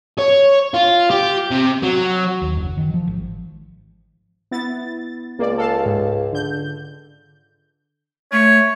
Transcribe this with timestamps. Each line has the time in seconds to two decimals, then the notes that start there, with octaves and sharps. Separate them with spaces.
0.19 C#5
0.74 F4
1.10 G4
1.51 C3
1.83 F#3
2.42 D#2
2.57 F#1
2.77 D#3
2.94 F3
3.07 G#1
4.51 B3 E4 A6
5.39 C#2 A#3 D5
5.58 A4 F5 A5
5.86 G#2
6.33 D3 G6
8.32 A3 C#5